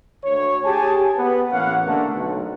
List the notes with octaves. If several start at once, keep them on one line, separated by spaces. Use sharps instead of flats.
D2 C#5
G4 G#4 G#5 A5
B3
A1 A#3 B3 C#4 F5 F#5
D3 A3 A#3
B1